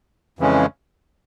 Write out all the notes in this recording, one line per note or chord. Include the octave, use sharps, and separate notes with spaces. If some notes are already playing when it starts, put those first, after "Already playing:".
F2 C#3 E3 G#3 C#4